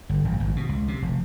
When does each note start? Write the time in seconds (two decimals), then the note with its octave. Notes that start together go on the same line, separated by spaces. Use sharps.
0.09 G1
0.25 G1
0.40 G#1
0.56 B2
0.69 C#2
0.88 C3
1.02 F1